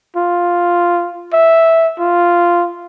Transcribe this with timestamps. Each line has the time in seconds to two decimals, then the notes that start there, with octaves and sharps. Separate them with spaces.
0.16 F4
1.33 E5
1.99 F4